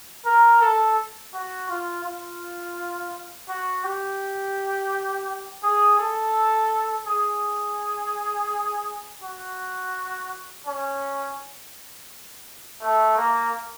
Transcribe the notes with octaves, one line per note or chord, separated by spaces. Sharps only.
A#4
A4
F#4
F4
F4
F#4
G4
G#4
A4
G#4
F#4
C#4
A3
A#3